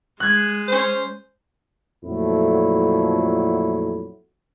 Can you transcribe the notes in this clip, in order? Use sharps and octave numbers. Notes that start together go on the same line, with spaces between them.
G#3 F#6 G#6
C#4 C5
F2 A#2 F#3 A3 E4